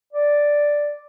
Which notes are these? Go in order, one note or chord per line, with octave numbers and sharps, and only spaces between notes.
D5